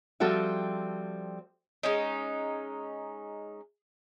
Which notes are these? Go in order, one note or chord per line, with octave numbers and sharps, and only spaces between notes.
F3 G3 C4 F#4 A4 E5
G#3 C#4 D#4